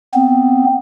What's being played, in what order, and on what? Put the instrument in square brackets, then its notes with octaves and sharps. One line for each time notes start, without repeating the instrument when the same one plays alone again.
[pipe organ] B3 C4